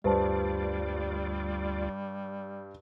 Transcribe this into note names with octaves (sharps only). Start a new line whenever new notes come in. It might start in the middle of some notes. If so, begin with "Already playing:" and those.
D2 G2 G3 F4 B4 C5 D5 A5